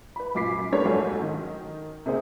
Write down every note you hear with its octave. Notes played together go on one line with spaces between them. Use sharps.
B4 B5
F#2 A#2 D6 B6 C7
G3 A#3 D4 A4 B4 C#5
B1 G#2 F#3 A3 G#5
D#3
C3 A#3 G#4 C5